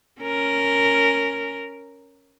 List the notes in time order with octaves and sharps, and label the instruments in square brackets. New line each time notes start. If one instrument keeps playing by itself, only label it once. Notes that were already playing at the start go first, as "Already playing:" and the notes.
[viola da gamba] C#4 A#4